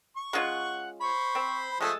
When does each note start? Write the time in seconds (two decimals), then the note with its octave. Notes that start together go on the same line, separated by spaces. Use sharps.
0.16 C#6
0.33 G#3 C#4 F4 F#5
1.01 C5 B5 C#6
1.35 C4
1.81 F3 G#3 A3 A4 E5 D#6